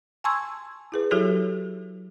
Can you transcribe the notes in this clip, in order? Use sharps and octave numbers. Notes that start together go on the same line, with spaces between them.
G#5 A5 C6 C#6 E6 G#6
E4 G#4 B4
F#3 E4 F#4 G4 A4 C#5